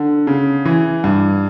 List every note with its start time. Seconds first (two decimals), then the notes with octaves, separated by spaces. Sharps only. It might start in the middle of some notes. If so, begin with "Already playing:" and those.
Already playing: D3
0.27 C#3
0.66 E3
1.04 G2